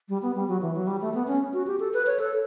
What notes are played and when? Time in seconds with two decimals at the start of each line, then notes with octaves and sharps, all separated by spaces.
0.09 G3
0.22 B3
0.35 G3
0.48 F#3
0.62 E3
0.75 F#3
0.87 G3
1.01 A3
1.14 B3
1.27 C#4
1.53 F#4
1.67 G4
1.80 A4
1.94 B4
2.07 C#5
2.19 A4